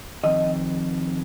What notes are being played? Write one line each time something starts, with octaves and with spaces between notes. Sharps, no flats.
F2 D#3 D#5